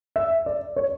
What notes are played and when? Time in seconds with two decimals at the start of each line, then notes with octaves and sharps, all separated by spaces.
0.16 E5
0.46 D5
0.76 C#5